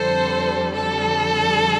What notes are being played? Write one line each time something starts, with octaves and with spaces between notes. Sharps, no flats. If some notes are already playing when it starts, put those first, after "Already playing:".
Already playing: F2 D3 G3 A4 C5
A4